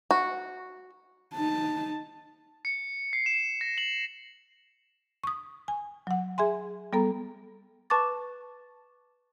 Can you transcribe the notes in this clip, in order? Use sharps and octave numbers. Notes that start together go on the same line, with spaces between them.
F#4
D#4 A5
C#7
C7
E7
A#6
F#7
C#6 D#6
G#5
F#3 F#5
G#4 E5 G#5 C6
G3 B3 A4 A#5
B4 A5 C#6 D6 A6